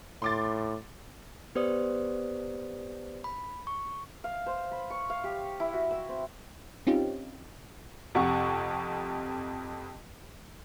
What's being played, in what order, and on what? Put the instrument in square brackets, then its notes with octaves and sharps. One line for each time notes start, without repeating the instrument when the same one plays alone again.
[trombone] A2 [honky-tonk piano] C6 D6 A6
[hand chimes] B3 G4 B4 C5 D5 D#6
B5
C#6
[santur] F5
C5
B5
C#6
F5
G4
E4
F#4
E6
C4
[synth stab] C4 C#4 D#4 F4 G4
[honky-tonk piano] F2 C3 F#5 C#6